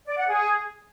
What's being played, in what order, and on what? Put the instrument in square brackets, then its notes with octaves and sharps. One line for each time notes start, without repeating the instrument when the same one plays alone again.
[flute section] D5
F#5
G#4